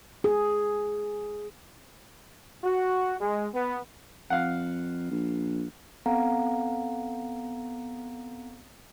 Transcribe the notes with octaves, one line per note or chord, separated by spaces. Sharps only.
G#4
F#4
G#3
B3
F2 F5 F#5
A#1
B3 C4 A4 F5 F#5 A#5